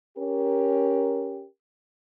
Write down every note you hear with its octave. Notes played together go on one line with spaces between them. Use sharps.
C#4 G4 A#4